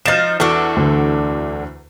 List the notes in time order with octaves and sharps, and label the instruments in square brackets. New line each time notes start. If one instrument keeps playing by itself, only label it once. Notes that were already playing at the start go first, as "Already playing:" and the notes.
[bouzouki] F3 D#4 [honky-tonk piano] F6 A6 E7
[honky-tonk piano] E2 [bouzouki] D4 F#4 A4
[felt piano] D2 D3